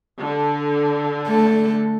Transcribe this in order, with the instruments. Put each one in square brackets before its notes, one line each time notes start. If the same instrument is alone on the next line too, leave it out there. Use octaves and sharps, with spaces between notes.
[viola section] D3
[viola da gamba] A3 A4